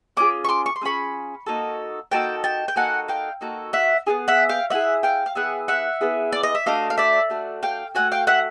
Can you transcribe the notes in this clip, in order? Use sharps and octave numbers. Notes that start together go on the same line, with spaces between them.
A3 C#4 F4 G#4 D6
C#6
C6 D6
C#6
C6
A3 C#4 F4 G#4 B5 C#6
A#3 D#4 F#4 A4
A#3 D#4 F#4 A4 G5 A5
G5 A5
G5
A#3 D#4 F#4 A4 F#5 G#5
F5 G5
A#3 D#4 F#4 A4
E5 F#5
B3 E4 G#4
E5 F#5
F5 G5
B3 E4 G#4 E5 F#5
F5 G5
F5
B3 E4 G#4 E5 F#5
E5 F#5
B3 E4 G#4
D5
D#5
E5
A3 D4 F#4 D#5 F5
F5
D5 E5
A3 D4 F#4
F5 G5
A3 D4 F#4 F#5 G#5
F5 G5
E5 F#5